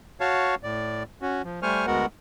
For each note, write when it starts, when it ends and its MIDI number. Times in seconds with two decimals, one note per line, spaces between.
0.20 0.55 66
0.20 0.55 73
0.20 0.55 77
0.20 0.55 81
0.63 1.03 45
0.63 1.03 74
1.22 1.42 61
1.22 1.42 66
1.44 1.60 53
1.63 1.86 55
1.63 1.86 57
1.63 1.86 72
1.63 1.86 80
1.63 1.86 85
1.63 1.86 89
1.87 2.06 38
1.87 2.06 56
1.87 2.06 59
1.87 2.06 66
1.87 2.06 70
1.87 2.06 78